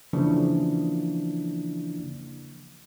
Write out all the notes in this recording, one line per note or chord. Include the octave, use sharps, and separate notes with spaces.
C#3 E3 F3 A#3 D4 E4